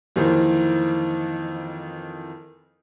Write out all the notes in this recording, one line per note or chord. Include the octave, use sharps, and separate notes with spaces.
F2 D#3 E3 A#3 C4